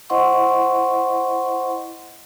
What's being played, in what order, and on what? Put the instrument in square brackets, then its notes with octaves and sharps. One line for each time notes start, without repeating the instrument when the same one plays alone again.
[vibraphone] E4 C5 D#5 F#5 C6 C#6